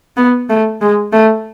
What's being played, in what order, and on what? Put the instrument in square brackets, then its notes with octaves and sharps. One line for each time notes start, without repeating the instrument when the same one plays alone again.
[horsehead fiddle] B3
A3
G#3
A3